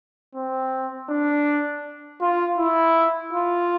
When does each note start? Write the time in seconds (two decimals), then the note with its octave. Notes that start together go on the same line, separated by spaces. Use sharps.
0.35 C4
1.10 D4
2.21 F4
2.58 E4
3.33 F4